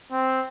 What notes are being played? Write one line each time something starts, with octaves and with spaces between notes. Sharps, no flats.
C4